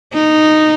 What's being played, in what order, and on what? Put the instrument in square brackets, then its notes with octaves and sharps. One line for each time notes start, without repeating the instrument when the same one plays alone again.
[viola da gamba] D#4